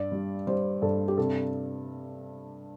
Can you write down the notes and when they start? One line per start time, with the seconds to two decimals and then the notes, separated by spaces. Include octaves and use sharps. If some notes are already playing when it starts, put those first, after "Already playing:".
Already playing: G2 D5
0.12 G3
0.47 G3 C5
0.82 G2 A4
1.08 G4
1.18 C3 A4